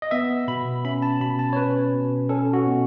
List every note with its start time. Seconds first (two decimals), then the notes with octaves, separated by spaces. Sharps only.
0.02 D#5
0.11 B3 E5
0.48 B2 B5
0.85 C#4 B5
1.02 A5
1.21 B2 B5
1.39 A5
1.53 C#5
1.56 C#4 B4
1.93 B2
2.29 C#4 A4
2.53 F#4
2.66 B2